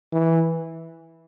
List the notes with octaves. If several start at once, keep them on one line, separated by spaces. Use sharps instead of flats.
E3